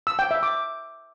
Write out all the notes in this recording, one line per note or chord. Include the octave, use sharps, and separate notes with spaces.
E6
G5
E5
D6